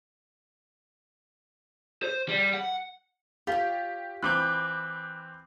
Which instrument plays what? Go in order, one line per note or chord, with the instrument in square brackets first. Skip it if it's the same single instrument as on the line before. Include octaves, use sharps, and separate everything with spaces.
[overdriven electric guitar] C5
G3
F#5
[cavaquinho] F4 C#5 [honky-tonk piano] G4
[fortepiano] E3 C4 [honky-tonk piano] B5 D6 G6 [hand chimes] F#6